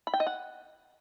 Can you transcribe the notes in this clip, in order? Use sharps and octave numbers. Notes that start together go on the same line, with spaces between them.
B5
G5
D#5
F#5